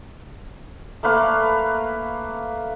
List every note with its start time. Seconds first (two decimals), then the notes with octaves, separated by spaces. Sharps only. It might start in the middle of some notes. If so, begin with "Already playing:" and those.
1.03 A3 A#3 B4 F5